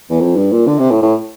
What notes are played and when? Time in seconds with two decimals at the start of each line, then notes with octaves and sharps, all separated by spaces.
0.10 E2
0.20 F2
0.36 G2
0.52 A#2
0.67 D3
0.79 C3
0.91 A2
1.02 A2